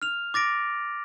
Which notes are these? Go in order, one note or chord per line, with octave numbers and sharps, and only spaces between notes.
F6 F7
D6 A6 A#6 D7